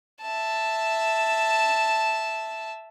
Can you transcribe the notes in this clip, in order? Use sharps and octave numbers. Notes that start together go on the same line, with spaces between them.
E5 A5